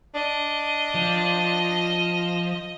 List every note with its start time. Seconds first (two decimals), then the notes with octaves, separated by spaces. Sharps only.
0.15 D4 D#5
0.94 F3